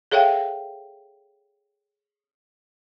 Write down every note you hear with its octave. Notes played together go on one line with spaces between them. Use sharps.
G#4 A4 C#5 E5 F5 G5